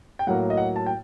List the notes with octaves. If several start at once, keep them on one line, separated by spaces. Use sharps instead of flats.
G5
A2 F#3 A#3 F#5
D#5
F#5
A5
G5